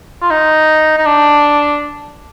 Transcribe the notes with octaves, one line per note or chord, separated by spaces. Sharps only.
F4
D#4
D#4
D4